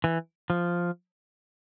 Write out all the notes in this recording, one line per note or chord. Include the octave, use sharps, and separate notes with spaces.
E3
F3